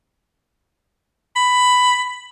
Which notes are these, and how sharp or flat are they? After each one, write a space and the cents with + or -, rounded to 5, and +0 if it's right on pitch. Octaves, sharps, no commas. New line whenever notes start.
B5 +10